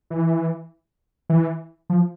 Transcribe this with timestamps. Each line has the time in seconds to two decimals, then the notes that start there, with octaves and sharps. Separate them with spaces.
0.10 E3
1.30 E3
1.90 F3